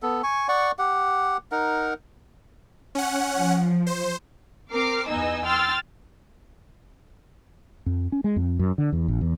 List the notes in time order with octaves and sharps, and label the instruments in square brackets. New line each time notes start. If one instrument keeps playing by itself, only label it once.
[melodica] B3 A4
G#5 C#6
D5 F#5 C#6
G4 F#5
D#4 A#4 F#5
[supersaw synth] C#4 F#5
[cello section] F3
[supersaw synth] C5
[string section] C4 A#4 D6 F6 C7
E2 B3 D#4 D#5 G#5 E6
G5 C6 E6 F6 A6
[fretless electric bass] F2
C#4
G#3
F2
F#2
D3
E2
A#1
E2